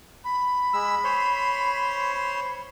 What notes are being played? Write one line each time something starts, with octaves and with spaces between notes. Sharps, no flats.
B5
G#3 E6
C5 C#5 C6